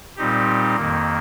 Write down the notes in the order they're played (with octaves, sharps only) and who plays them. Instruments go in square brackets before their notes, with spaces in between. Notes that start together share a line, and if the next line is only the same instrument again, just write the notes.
[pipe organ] A#2 G3 C4 D#4 G4
F2 D#3 A#3